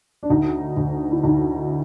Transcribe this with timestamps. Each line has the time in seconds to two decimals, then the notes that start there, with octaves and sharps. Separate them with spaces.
0.23 D4
0.30 D2 D#4
0.77 D2
1.12 E4
1.23 D2 D#4